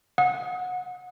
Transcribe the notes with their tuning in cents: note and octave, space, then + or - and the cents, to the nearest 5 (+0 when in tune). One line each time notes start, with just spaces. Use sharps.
F#5 -25 D#6 +30